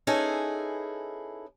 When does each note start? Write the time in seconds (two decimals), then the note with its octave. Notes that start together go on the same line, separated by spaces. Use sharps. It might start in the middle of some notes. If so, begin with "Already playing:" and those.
0.07 C#4 D#4 E4 G#4 A4 B4